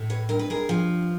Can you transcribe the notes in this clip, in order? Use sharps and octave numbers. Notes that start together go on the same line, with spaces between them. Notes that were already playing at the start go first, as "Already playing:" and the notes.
Already playing: A2
B4 C#5
G2 A#4
B4
G#4 A#4
F3